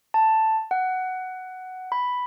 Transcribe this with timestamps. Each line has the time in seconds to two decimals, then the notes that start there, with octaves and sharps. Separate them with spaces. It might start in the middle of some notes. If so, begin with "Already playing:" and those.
0.14 A5
0.71 F#5
1.92 B5